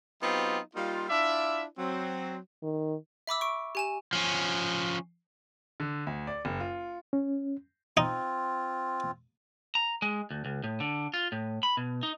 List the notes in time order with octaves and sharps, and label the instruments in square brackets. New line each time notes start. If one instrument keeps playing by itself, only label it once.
[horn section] F#3 B3 C4 D#4 F4 G4
G3 A#3 D#4 F4
D4 E4 F4 D5 E5
F#3 C4
[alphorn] D#3
[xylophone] E5 B5 D6 E6
C#6 D7
G4 G#5 E7
[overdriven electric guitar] F3 C#4
[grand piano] D3
D2
D5
F#1
F4
[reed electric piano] C#4
[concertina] C4 F4 [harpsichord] D#4
[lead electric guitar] A#5
G#3
D2
C#2
A2
D3
F4
A2
B5
B2
D#4